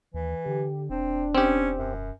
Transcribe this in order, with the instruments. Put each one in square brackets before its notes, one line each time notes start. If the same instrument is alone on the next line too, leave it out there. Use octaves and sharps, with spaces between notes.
[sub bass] D#2 [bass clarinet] E3
[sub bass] D3 [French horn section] G4
[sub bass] E1 [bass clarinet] C4 [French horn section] D4
[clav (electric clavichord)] C4 G4 [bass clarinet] C#4
[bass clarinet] F#2